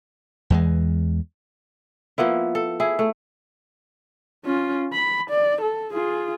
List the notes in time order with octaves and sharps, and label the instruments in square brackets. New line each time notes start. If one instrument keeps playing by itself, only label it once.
[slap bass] E2 E3 G#3
[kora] F3 A#3 B3 E4
A4
E4 G#4
A3
[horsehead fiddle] C#4 F4
B5
D5
A4
F4 G#4